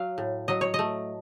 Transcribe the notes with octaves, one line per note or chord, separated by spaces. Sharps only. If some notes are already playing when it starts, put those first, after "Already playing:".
Already playing: F#3 F5
A2
F#3 D#5
C#5
A3 D#5